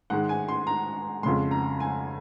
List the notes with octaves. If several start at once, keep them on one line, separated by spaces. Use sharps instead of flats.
G#2 D#3 G#3 F#5
G#5
C6
A#5
F2 C#3 G#3 C6
A#5
G#5